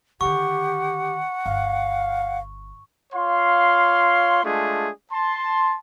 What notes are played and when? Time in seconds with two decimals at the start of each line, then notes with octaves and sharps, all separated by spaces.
0.21 D3 D#3 G4 F#5 C#6
1.46 G1 F5
3.13 F4 C#5 F5 C6
4.44 G#3 A3 D4 F4 G#4
5.12 A5 C6